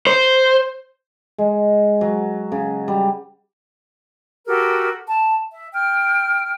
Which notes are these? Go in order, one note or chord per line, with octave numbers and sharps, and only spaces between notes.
C5
G#3
F#3
C#3
G3
F#4 G4 A4 A#4
A5
E5
G5 F6